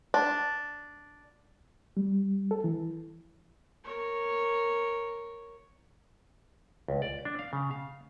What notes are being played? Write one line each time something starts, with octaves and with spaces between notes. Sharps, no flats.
D4
G3
A4
E3
A#4 C#5
C#2
D5
D4
F5
C#3
F5